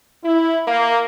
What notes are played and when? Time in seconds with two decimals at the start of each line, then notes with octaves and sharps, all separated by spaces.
0.25 E4
0.66 A#3